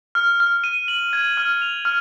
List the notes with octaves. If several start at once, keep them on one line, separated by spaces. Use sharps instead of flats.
F6
F6
D#7
F#7
G#6
F6
F7
F6